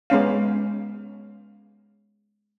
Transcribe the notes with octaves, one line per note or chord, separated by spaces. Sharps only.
G#3 B3 C#4 F5